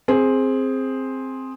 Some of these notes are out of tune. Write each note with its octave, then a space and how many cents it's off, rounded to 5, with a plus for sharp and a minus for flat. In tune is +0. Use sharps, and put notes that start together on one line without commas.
C4 +5 G#4 +0